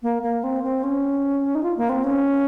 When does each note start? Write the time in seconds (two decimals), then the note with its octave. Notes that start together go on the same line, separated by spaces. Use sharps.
0.03 A#3
0.23 A#3
0.44 C4
0.64 C4
0.83 C#4
1.55 D#4
1.63 F4
1.77 A#3
1.89 C4
2.04 C#4